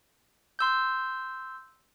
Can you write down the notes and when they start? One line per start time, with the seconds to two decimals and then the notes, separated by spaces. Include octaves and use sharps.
0.59 C6 E6 G6